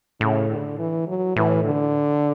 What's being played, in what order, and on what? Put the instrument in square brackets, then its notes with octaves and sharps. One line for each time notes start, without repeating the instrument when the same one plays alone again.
[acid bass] A2 [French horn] C#3
[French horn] D3
E3
F#3
[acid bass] A2 [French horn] E3
[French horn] D3